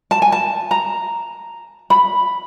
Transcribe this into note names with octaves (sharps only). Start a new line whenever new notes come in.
A5
G#5
A5
A#5
B5